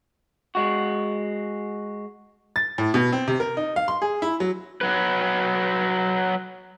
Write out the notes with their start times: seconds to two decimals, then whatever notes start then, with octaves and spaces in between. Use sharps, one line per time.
0.55 G#3 F#4
2.56 A6
2.78 A2
2.94 B2
3.13 C4
3.28 C3
3.40 A#4
3.57 D#4
3.76 F5
3.88 C6
4.02 G#4
4.22 E4
4.40 F#3
4.81 F#3 B4